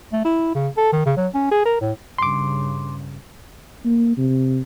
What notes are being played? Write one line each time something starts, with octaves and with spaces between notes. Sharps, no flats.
A3
E4
C#3
A4
D#3
C#3
F#3
C#4
G#4
A#4
A2
G2 C#3 C6 D6
A#3
C3